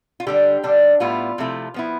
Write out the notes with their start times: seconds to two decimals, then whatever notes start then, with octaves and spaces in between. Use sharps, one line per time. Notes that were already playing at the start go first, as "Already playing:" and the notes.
0.20 F4
0.27 D3 G3 D4 G4
0.63 D3 G3 D4
1.00 A2 G3 B3 E4 F4
1.38 C3 F3 A3 E4
1.74 F3 B3 E4